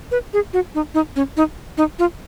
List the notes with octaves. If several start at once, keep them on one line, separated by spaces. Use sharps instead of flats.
B4
G#4
F#4
D#4
D#4
C#4
D#4
D#4
F4